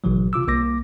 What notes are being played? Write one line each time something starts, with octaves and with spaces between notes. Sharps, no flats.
G#1 B2 E3 F#3
C3 F4 D6 E6
C2 A#3 D6 A#6